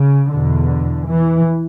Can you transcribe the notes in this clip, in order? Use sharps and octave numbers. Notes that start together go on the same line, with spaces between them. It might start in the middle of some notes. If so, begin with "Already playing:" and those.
Already playing: C#3
E2 B2 D3
E3